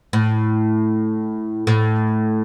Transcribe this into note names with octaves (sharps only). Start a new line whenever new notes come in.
A2
A2